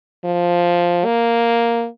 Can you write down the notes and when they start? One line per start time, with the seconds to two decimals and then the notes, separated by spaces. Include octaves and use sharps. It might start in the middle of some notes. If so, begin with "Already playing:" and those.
0.24 F3
1.05 A#3